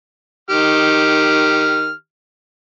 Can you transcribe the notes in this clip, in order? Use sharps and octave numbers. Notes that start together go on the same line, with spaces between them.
D#3 G4 F6